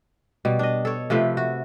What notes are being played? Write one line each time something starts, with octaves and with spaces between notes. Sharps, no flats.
B2 G3
D4 D#5
A4 C#5
C3 F3 A3 B4
F#4